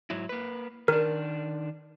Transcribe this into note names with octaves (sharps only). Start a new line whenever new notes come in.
G#2 F#3 E4
A#3 B4
D#3 D4 A#4